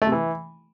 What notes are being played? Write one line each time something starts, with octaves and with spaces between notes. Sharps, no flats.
A3
C3
E3